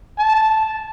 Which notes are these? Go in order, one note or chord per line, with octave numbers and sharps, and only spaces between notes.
A5